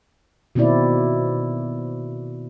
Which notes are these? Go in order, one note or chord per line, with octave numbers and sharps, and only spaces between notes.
B2 D#3 A#3 C4 E4 D5